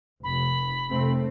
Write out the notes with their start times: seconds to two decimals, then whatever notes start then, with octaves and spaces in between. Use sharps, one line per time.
0.24 F1 B5
0.91 F1 A3 C4